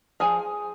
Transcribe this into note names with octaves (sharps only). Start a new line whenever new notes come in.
F3 G#4 G#5